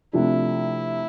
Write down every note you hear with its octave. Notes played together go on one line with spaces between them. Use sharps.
C3 F3 A3 D4 E4 G4